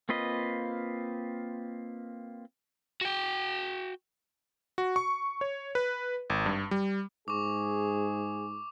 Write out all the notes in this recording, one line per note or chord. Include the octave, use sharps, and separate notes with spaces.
A#3 C4 F4 B4 D#5
F#4 G5
F#4
C#6
C#5
B4
G#1
G2
G3
G#2 G#4 C#6 D6